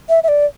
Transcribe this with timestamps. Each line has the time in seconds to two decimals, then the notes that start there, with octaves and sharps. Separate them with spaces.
0.09 E5
0.24 E5
0.28 D5